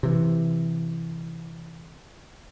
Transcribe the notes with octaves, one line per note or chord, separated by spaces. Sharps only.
C3 E3